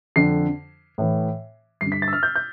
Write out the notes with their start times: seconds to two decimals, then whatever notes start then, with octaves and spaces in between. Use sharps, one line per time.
0.16 F2 D3 C7
0.98 A2 E3
1.81 G2 D3 C7
1.92 B6
2.02 A6
2.08 E6
2.13 F6
2.23 G6
2.36 G6